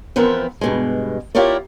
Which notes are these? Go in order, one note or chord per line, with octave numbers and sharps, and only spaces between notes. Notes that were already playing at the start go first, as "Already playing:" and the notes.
E3 F3 B3 C4 A#4 B4
G2 B2 G#3
E4 F4 G4 A#4 C#5 D5